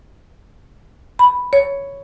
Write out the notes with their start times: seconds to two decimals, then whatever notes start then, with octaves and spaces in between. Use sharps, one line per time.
1.19 B5
1.53 C#5